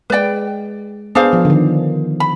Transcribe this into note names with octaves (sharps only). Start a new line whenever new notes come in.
G#3 B4 D5 G5
B3 D4 G#4 C5 F5
F3
D3
D#3
B5